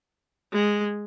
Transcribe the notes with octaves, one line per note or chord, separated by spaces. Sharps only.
G#3